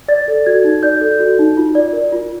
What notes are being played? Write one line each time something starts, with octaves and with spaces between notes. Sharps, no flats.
D5 A6
A4
F#4 G#6
D#4
D5 G6
A4
F#4
D#4
F4
D5
A#4
F4